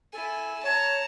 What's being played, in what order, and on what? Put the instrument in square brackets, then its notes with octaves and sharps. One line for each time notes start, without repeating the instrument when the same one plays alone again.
[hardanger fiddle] E4 G#5 [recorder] A4
[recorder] C#5 [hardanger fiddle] A5 A#5